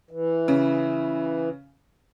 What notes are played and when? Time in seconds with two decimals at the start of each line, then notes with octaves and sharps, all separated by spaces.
0.11 E3
0.48 C#3